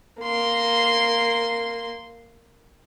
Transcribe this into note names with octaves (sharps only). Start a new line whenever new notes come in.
A#3 C6